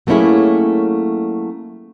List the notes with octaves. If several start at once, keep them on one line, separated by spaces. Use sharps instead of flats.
F#3 A3 A#3 C#4 E4 G#4